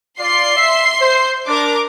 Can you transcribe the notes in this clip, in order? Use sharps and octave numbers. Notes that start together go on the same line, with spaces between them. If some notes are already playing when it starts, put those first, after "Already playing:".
F4 D5 C6 C7
E5
C5
D4 A#4 D6